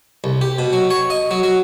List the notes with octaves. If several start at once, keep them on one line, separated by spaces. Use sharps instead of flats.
C2
G4
B2
F#3
C#5
D#5
F#3
F#3